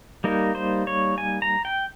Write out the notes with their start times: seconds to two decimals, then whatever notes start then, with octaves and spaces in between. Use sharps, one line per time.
0.24 G3 A#3 D#4 A#4
0.55 C5
0.87 C#5
1.18 G#5
1.42 A#5
1.65 G5